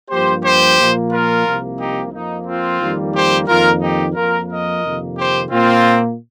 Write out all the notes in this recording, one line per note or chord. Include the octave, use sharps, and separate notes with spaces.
G2 F3 A#3 G4 C5
G4 C5
A#2 F3 A#3
F4 A#4
C2 C3 F3 A#3
D#4 G4
F2 F3 A#3 D#4
C4 F4
F2 D#3 G3 A#3
G4 C5
F2 D#3 A#3 F4 A#4
D#4 G4
F2 F3 A#3 F4 A#4
A#4 D#5
F2 C3 D#3 A#3
G4 C5
A#2 A#3 C4 F4